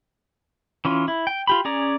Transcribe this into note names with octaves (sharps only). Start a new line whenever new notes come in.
E3 C#4 F4
E4
G5
F4 G4 B5
C#4 G#4 D5 A#5